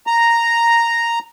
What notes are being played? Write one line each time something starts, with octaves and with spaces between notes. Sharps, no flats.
A#5